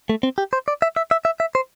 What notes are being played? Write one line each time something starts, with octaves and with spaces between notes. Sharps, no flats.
A3
C4
G4
C5
D5
E5
E5
E5
E5
E5
C5